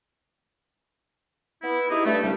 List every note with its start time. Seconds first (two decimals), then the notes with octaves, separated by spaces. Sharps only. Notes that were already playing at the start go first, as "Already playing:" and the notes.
1.62 B3 E4
1.90 D#4 E4 G4 G#4 D#5
2.04 G2 A3
2.22 C2 C#3 G3 D4 G4